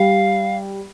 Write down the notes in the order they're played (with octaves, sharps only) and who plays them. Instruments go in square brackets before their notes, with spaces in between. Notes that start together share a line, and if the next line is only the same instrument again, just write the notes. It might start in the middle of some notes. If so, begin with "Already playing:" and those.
Already playing: [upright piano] G3 [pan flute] F5